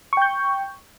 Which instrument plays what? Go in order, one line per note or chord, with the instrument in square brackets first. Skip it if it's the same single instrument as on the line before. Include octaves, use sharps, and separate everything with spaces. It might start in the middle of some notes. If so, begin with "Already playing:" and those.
[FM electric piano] C#6
G5
G6